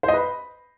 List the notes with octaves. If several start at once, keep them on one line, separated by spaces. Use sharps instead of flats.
C5
D#5
B4
B5